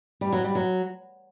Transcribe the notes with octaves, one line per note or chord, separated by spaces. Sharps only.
G3
F#3
G3
F#3